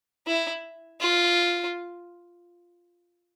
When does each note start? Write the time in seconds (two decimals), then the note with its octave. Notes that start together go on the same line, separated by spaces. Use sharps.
0.27 E4
1.00 F4